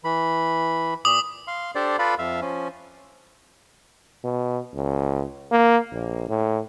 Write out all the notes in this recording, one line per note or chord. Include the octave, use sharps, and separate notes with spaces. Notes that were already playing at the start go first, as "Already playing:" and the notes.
E3 B5
A#2 D6 D#6 F#7
F5 C6
D4 G4 A4 C5 D5
F4 A4 B4 D5 F5 B5
F2 E5 F5
F3 C#4
B2
C#2
A#3
A#1
A2